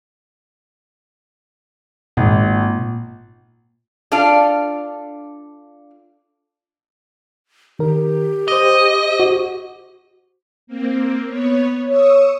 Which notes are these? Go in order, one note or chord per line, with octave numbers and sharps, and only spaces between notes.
G#1 A#2
D4 F4 A4 D5 F5
D#3 G4 A#4
C5 D#5 D6
F#4
A#3 C4
B3 C#5
C#5 C#6 D#6 E6